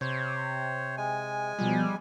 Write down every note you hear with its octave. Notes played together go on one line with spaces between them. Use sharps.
C3 C5 C#5
G#3 G#5
B2 F3 G3